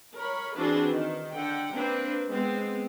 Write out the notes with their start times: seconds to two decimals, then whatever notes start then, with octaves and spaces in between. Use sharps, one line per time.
0.16 A#4 C#5 B5
0.55 E3 C4 D4 F#4 G#4 B4
0.93 D#3
1.35 D3 F#5 G5
1.75 A#3 C4 D4 B4
2.29 G#3 B3 C4